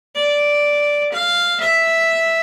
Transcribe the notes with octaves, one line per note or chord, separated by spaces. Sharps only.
D5
F5
E5